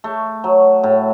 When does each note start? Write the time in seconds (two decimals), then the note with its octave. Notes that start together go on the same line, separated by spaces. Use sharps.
0.04 A3
0.44 F#3
0.83 A2